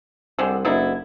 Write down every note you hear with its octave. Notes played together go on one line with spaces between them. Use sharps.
C2 D3 G#3 C4
F#1 D3 D#4 E4